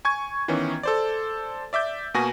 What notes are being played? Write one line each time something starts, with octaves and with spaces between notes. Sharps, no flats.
G#5 C#6 G#6
D#3 E3 B3 C#4
A4 C5 D5
D5 E5 D6 G6
B2 A#3 F#4 B4 G#5 A#6